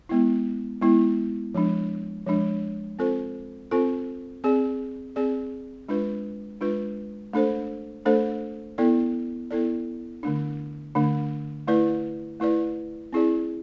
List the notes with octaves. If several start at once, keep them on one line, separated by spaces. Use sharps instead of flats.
G#3 B3 E4
G#3 B3 E4
F3 G#3 D4
F3 G#3 D4
C4 F4 A4 C5
C4 F4 A4 C5
C4 G#4 D5
C4 G#4 D5
G#3 D4 F4 B4
G#3 D4 F4 B4
A3 D4 A4 C5
A3 D4 A4 C5
B3 E4 A4 D5
B3 E4 A4 D5
D3 A3 D4
D3 A3 D4
A3 E4 B4 D5
A3 E4 B4 D5
C4 E4 G#4 D5